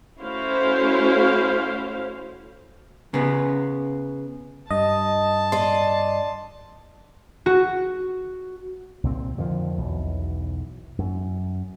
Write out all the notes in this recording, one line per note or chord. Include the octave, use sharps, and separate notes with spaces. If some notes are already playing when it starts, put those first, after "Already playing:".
A3 C#4 E4 F#4 C5 F5
C#3 B3
G2 D#5 A5
D5 D#5 C6
F#4
C2 A#2 C4
F2 D3 D#3 F3
B1 E2 B2
F#2